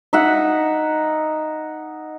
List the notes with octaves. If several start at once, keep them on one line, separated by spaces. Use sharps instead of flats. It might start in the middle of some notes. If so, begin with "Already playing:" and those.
D#4 E5 F#5